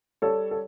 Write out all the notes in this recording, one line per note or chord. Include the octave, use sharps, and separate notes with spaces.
G3 A4 C#5
A4